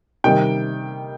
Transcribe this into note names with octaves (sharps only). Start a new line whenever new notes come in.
C3 D#3 G3 G5